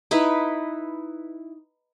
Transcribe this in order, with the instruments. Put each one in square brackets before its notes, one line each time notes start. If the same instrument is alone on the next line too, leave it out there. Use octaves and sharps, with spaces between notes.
[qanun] D#4 E4 B4 E5